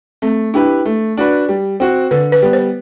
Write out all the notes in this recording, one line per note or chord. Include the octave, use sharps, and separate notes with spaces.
A3 C4
D4 E4 G4 B4
A3
D4 F#4 B4
G3
C4 F#4
D3 B4
B4
G3 B3
C5